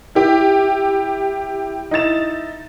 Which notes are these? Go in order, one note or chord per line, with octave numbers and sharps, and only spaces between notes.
E4 G4
D#4 E4 A6 E7